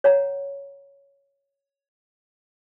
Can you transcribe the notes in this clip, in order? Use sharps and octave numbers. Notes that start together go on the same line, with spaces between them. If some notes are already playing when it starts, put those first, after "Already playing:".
C#5 F#5 A#5